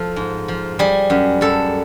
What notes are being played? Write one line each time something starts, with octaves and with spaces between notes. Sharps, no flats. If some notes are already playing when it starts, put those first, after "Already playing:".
Already playing: F3 A4
G#2
F3
G3 G#4
F#2
F#2 A4